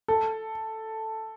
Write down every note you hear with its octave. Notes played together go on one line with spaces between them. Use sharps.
A4